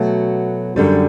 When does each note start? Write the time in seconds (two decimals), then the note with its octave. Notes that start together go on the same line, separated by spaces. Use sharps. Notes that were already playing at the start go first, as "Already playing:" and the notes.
Already playing: B2 F#3 A3
0.76 F#2 D3 G3